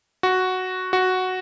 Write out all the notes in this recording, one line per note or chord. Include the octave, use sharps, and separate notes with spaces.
F#4
F#4